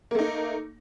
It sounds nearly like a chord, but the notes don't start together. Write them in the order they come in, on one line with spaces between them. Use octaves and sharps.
A#3 A3 D#4